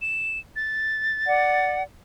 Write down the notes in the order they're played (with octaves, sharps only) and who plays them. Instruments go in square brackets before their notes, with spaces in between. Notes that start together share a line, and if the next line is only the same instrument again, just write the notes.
[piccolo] E7
A6
[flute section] D5 F#5